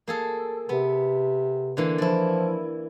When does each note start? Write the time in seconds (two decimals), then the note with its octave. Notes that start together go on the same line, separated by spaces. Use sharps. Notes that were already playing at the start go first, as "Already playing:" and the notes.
0.08 A#3 G#4 A4
0.69 C3 B3
1.77 D3 E3 A#3
1.98 F3 E4 D5